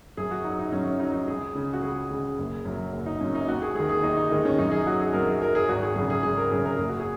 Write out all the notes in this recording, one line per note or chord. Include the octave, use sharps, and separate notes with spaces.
F#2 G#4
F#4
F#3 D#4
D#4
F#2 C#4
C#4
F#3 D#4
D#4
C#2 G#4
C#3 G#3
F#4
C#2 G#4
C#3 G#3
F#1
F#2 F#3
F#1
D#4
F#2 F#3 C#4
D#4
D#2 F#4
G#4
D#3 G#3 G#4
G#4
D#2 D#4
D#4
D#3 G#3 D#4
C#4
F#2 D#4
G#4
F#3 F#4
G#4
F#2 A#4
G#4
F#3 A#4
G#4
G#1 F#4
G#4
F#2 C#3 G#4
G#4
G#1 G#4
A#4
F#2 C#3 G#4
A#4
F#1 G#4
F#4
G#4